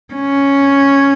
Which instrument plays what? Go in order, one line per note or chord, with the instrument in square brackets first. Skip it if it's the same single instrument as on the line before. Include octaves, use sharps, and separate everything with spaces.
[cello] C#4